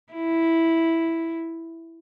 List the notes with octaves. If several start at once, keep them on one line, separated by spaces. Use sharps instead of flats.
E4